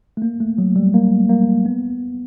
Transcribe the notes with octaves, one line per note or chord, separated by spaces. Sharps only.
A3
A#3
A3
F#3
G3
A#3
A#3
B3